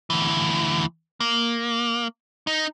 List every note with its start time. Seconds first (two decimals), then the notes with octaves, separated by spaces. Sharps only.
0.10 D2 E3
1.20 A#3
2.47 D#4